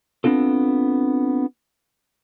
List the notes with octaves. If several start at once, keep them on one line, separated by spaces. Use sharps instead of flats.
B3 C4 D4 F4 A4